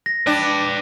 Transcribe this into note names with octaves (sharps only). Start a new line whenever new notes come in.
A#6
D4 B4 G5